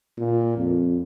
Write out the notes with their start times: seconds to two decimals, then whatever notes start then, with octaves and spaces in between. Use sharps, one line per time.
0.18 A#2
0.58 F2